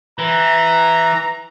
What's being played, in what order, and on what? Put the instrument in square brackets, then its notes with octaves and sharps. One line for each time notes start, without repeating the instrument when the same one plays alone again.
[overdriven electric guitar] E3 [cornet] A#5